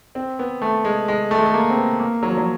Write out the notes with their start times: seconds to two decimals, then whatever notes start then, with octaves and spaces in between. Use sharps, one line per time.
0.15 C4
0.39 B3
0.62 A3
0.85 G#3
1.08 G#3
1.31 A3
1.38 G#3
1.46 A3
1.54 A#3
1.70 C4
1.76 B3
1.99 A#3
2.23 F#3
2.30 F3
2.38 F#3